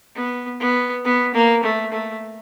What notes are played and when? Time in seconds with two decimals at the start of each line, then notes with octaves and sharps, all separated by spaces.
0.16 B3
0.60 B3
1.05 B3
1.34 A#3
1.64 A3
1.92 A3